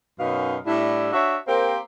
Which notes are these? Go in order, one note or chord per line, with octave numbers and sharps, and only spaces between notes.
F#2 B2 C#4 D#4 F5
A2 G3 D4 E4
D4 F#4 C#5 E5
A#3 C4 G4 A#4 C5